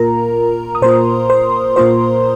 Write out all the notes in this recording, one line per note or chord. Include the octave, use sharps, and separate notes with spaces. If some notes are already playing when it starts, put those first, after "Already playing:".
Already playing: A#2 A#3 F4 A#4 A#5
D#6
A#2 A#3 F4 C5 C6
C5 C6
A#2 A#3 F4 C5 C6